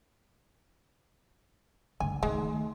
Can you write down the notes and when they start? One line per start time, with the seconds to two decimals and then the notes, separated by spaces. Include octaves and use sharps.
2.00 G2 D3 G#5
2.23 D#3 G#3 A3